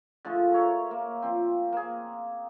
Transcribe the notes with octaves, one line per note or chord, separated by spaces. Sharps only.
D3 F3 A3 G#4
A4 A#4 C#5 E5
A#3
F3 C4
A#3 G#4